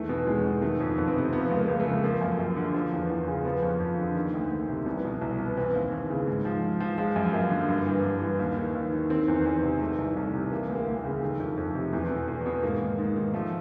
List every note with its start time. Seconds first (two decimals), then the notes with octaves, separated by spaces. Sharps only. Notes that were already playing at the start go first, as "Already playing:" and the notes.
Already playing: E2 D#3 A3
0.09 B2
0.27 E2 G#3
0.45 B2
0.62 D#3 A3
0.80 F2
0.98 F2 B3
1.08 C4
1.16 C3 B3
1.33 F3 B3
1.51 C#2
1.57 A#3
1.68 C#2
1.80 A3
1.86 C#3
2.04 F3 A#3
2.21 F#2
2.39 F#2
2.56 D3
2.74 F3
2.92 E2
3.10 E2
3.28 C#3
3.45 F3 B3
3.62 F2
3.80 F2
3.98 D3
4.15 D#3 A#3
4.34 D2
4.51 D2
4.69 C3
4.86 C2 B3
5.04 B2
5.21 C2
5.39 B2
5.46 B3
5.57 E3 C4
5.75 D#2
5.92 D#2
6.10 C#3
6.27 G#2
6.45 F3
6.63 G#2
6.80 F3
6.98 F3 G#3
7.16 F#2
7.33 F#2 A#3
7.51 D3
7.69 G2
7.87 E3
8.04 G2
8.22 E3
8.39 D#2
8.57 D#3
8.75 D#2
8.92 D#3
9.10 D#3 C4
9.28 E2
9.46 E2
9.63 C3
9.81 D#3 A3
9.98 C2
10.16 C2
10.34 C3
10.51 E3 A#3
10.69 D2
10.75 A#3
10.87 D2
10.99 A#3
11.04 C#3
11.22 D#3 A3
11.40 F2
11.57 F2
11.75 C3
11.93 E2 A3
12.10 B2
12.28 E2
12.46 B2
12.63 G#2 A#3
12.81 D#3
12.98 G#2
13.16 D#3
13.34 F3 A3